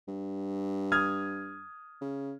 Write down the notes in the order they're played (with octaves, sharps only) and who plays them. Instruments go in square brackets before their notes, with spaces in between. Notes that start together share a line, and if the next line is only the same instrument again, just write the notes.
[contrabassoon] G2
[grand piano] D#6 F6 G#6
[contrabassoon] C#3